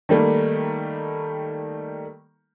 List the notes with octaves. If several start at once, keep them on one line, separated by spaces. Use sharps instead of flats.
D#3 G3 A3 A#3